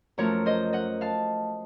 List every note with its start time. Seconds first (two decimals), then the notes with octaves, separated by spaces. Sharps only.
0.18 F#2 F3 A3 A#4 C#5
0.46 C5 D#5
0.73 D#5 F#5
1.01 F5 A5